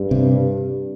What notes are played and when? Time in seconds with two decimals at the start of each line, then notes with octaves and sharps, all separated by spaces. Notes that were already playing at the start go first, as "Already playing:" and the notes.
Already playing: G2
0.11 C3